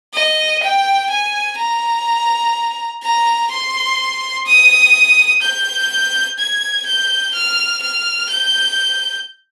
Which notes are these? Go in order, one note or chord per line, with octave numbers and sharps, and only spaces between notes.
D#5
G5
G#5
A#5
A#5
C6
D#6
G6
G#6
G6
F6
F6
G6